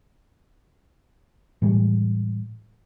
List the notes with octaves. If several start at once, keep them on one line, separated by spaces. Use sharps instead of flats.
A2 E3 G3 G#3